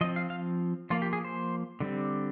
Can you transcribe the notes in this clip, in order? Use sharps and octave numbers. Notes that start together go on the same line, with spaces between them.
F3 C4 D#5
F5
F5
F3 A#3 F4
G4
G#4
C5
D3 G3 C4